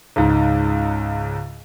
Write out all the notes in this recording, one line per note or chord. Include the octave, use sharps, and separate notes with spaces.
C#2 G#2